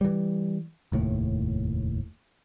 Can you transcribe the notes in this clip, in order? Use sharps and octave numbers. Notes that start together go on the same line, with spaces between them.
E3 G3
F1 D#2 A2